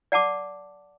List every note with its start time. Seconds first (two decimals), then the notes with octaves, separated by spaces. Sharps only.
0.12 D5 F#5 A5 D6